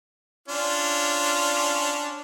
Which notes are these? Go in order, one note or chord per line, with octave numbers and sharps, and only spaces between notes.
C#4 D4 F4